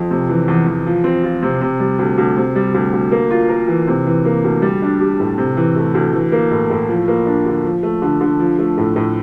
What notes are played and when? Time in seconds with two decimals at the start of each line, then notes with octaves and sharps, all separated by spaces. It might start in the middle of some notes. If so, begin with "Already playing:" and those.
Already playing: F2
0.11 C3
0.29 E3
0.48 E2
0.66 E2
0.86 F3
1.04 C4
1.23 F4
1.43 C3
1.61 C3
1.80 G3
1.99 D2
2.18 D2
2.37 C3
2.56 G3
2.74 D2
2.93 D2
3.12 A#3
3.31 F4
3.49 A#4
3.68 E3
3.87 C3
4.07 E3
4.25 A#3
4.44 D2
4.62 G3
4.82 D4
5.00 G4
5.20 A2
5.38 C3
5.57 E3
5.76 A3
5.94 D2
6.13 E3
6.32 A#3
6.51 A2
6.70 A2
6.89 F3
7.08 A#3
7.26 D4
7.46 D3
7.65 F3
7.83 A3
8.02 D3
8.21 D3
8.39 F3
8.59 A3
8.78 A2
8.96 A2